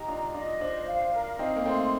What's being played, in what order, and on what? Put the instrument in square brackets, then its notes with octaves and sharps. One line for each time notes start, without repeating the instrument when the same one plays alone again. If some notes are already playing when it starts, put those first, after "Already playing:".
Already playing: [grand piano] D#4 G4 [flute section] A#5
[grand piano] D4 F4 [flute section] D#5
[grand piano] D4 F4 [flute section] D#5
[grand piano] D4 F4 [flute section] C5
[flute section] F5
A#4
[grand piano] C4 D#4 [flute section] F5
[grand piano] A#3
[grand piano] A3 C4 [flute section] C6